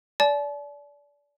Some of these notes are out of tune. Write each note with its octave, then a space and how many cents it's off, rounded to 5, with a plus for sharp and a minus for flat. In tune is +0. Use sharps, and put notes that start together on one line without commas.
D5 -25 A5 -45